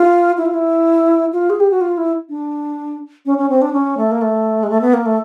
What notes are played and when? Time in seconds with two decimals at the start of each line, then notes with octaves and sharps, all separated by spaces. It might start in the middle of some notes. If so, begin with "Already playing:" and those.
Already playing: F4
0.37 E4
0.46 F4
0.54 E4
1.33 F4
1.50 G#4
1.60 G4
1.71 F#4
1.81 F4
1.98 E4
2.29 D4
3.26 C#4
3.38 C#4
3.50 C4
3.62 D4
3.73 C#4
3.97 A3
4.12 A#3
4.21 A3
4.63 G#3
4.70 A3
4.81 B3
4.94 A#3
5.06 A3